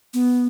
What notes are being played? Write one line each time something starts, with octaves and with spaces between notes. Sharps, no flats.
B3